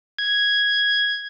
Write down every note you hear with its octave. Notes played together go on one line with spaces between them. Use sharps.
G#6